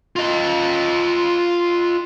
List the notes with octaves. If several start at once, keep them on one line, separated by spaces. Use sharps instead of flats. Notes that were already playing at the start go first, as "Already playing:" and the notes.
F4 D#5